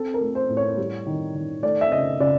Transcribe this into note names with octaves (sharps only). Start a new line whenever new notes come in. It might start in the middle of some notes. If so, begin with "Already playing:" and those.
Already playing: C4 A4
A#4
A3
C5
A2
C#5
G3
D#3
D#3
A3 D5
E5
C#3 D#5
C#3 D5